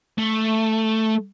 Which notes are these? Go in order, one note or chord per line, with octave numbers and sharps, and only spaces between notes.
A3